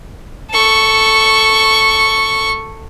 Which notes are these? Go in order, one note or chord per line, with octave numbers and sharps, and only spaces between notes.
A4 C#6